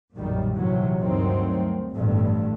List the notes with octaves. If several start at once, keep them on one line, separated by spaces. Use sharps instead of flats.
B1 F#2 A#2 D#3 G3
A#1 G#2 C3 E3 F#3
D2 G2 D#3 F#3 C4
A1 G2 B2 D3